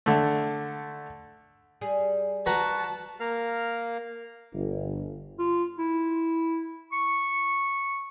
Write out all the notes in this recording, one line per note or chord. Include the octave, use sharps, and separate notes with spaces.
D3 A3
G3 G#4
F#4 B4 A5 A#5
A#3 A#4 F5 F6
G1
F4
E4
C#6